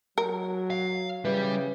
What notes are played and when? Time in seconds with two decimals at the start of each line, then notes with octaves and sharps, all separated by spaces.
0.18 F#3 A#4
0.70 F5
1.25 C#3 E3 G3